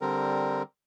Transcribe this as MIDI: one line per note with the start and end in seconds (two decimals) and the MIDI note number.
0.01 0.63 50
0.01 0.63 55
0.01 0.63 60
0.01 0.63 70